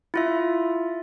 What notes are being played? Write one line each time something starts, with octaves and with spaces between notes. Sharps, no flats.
E4 F4 E5